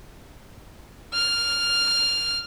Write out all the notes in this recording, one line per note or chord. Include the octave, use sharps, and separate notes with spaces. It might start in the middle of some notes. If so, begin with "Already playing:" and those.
F6